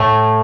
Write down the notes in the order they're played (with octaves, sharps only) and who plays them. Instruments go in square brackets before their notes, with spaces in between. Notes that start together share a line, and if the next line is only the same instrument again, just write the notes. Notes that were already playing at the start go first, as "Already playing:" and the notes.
Already playing: [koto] A2 A3